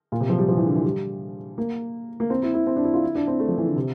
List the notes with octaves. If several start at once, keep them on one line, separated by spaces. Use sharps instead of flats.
A#2
C3
F3
G3
F3
E3
D3
E3
G3
A#3
A#3
C4
E4
E4
C4
D4
E4
F4
E4
D4
C4
A3
F3
E3
D3
C3